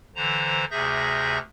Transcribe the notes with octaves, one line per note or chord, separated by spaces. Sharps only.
D3 E3 C5 A#5
D2 C3 G#4 E5 G6 A#6